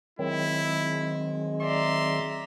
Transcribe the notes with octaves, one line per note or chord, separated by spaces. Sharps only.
D#3 F#3 G#3 C4 E4
D5 E5 A#5 C6